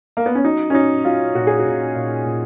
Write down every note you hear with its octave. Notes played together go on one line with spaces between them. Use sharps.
A#3
B3
C#4
F#3 D#4
C#4
F#3 D#4
F#3 F4
A#2 F#4
G#4
F#4
A#2
A#2
A#2